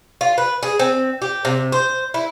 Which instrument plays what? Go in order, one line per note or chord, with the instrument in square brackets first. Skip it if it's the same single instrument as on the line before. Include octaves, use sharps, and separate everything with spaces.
[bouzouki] F4
B4
G#4
C4
G4
C3
C5
E4